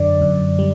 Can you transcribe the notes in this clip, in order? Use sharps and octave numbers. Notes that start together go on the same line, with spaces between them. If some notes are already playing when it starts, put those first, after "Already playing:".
Already playing: F#2 D3 D5
F#2
G3